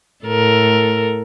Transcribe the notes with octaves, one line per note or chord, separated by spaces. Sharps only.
A2 A4 A#4